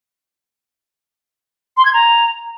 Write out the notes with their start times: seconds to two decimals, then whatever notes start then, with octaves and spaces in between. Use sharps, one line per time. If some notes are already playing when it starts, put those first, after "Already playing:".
1.77 C6
1.85 G#6
1.93 A#5